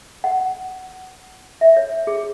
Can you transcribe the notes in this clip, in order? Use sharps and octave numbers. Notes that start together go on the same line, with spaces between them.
F#5
E5
C#5
G#4